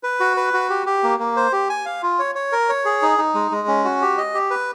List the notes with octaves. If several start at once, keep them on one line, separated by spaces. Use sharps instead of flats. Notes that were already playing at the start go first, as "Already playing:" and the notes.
B4
F#4
B4
F#4
G4
G4
A#3
A#3
C5
G4
G#5
F5
F4
C#5
C#5
A#4
C#5
G#4
D#4
D#4
G#3
G#3
C#4
F#4
G4
D#5
G4
B4